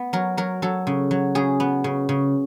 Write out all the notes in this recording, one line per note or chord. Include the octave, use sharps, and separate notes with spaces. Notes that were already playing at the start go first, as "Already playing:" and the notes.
Already playing: B3
F#3 A#4
F#3 A#4
F#3 A4
C#3
F#3
C#3 G#4
B3
C#3
C#3